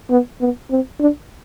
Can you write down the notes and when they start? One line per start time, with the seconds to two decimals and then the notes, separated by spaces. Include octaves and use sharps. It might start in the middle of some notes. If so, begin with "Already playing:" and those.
0.10 B3
0.41 B3
0.70 C4
0.99 D4